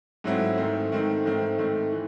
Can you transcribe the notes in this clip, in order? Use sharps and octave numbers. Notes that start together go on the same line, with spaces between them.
G#2 F#3 A3 C4 E4
G#2 D#3 A3 C4
G#2 D#3 A3 C4
G#2 D#3 A3 C4
G#2 D#3 A3 C4
E3